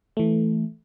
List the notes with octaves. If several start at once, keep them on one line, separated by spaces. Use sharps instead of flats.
E3 A3